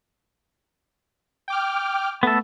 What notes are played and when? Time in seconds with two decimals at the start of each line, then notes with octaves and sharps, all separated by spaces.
1.48 G5 D6 F6
2.23 A3 B3 A4